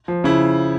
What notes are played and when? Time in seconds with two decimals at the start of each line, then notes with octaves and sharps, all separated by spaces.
0.08 F3
0.24 C#3 E4